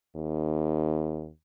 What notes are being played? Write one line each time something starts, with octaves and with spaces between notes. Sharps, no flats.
D#2